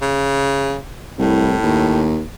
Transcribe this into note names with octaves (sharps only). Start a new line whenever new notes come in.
C#3
C2 A2
D#2